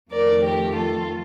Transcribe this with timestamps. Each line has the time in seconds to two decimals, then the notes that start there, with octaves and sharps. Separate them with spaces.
0.12 F2 D#3 A3 A#4 D5
0.44 G4 A#4
0.76 F4 A4